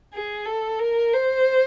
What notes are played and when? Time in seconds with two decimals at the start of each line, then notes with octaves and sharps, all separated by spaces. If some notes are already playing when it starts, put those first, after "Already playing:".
0.13 G#4
0.46 A4
0.79 A#4
1.13 C5